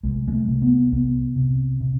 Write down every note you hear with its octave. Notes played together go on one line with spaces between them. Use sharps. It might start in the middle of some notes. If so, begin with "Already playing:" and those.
C2 G#3
G#3
A3
C3
B3
C2 B3
C3
C3